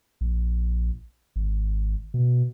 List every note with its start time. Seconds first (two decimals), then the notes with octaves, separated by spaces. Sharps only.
0.21 A#1
1.36 G#1
2.14 B2